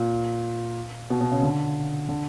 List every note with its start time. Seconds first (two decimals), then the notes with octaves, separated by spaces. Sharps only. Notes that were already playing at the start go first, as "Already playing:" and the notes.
Already playing: A#2
1.10 B2
1.21 B2
1.31 C#3
1.43 D3
2.09 D3